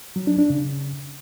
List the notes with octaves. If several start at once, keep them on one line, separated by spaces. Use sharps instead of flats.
F#3
D4
D4
C#3